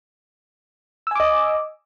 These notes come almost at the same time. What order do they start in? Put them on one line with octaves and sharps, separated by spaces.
E6 G#5 D6 D#5